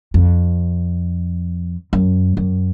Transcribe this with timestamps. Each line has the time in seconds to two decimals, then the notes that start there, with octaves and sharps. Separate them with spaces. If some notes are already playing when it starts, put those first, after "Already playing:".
0.14 F2
1.93 F#2
2.37 F#2